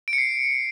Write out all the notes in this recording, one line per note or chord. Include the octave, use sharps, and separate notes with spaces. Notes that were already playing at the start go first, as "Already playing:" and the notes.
D7
C#7
C7